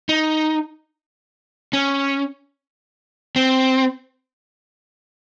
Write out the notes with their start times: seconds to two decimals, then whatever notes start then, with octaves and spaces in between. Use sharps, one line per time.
0.09 D#4
1.73 C#4
3.36 C4